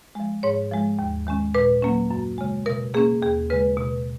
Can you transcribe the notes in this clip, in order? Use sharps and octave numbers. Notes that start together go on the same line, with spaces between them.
F3 G#3
G#2 C#5
F3 G#3
D#2
D#3 G#3 C#4
A#2 B4
F#3 A#3 C#4
F#2
C#3 G#3
B2 A#4
A#3 C#4 G#4
D#2 G#4
C#3 G#3 B4
B2